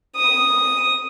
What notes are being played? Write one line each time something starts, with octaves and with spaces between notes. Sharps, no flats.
D#6